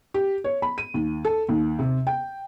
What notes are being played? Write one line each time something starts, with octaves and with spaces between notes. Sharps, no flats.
G4
C#5
B5
D#7
D#2
A4
D#2
C3
G5